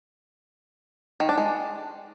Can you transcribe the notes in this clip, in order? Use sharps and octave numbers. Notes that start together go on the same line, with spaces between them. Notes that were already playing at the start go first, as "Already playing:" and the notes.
D#3
D4
G#3